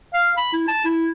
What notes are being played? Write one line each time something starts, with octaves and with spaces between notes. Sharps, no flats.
F5
B5
E4
A5
E4